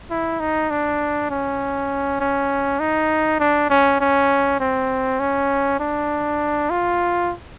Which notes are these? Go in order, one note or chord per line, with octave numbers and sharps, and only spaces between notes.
E4
D#4
D4
C#4
C#4
D#4
D4
C#4
C#4
C4
C#4
D4
F4